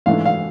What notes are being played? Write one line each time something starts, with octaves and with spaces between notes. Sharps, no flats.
G#2 E3 A3 D4 F5
F5